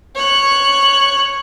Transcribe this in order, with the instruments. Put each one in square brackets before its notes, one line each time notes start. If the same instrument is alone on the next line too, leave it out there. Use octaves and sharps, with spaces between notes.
[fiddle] C#5 F#6